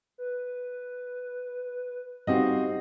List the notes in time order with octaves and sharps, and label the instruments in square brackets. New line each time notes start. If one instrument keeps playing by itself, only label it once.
[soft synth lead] B4
[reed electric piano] G2 D#4 G4 [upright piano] C4 F#4 D#5 [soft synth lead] F5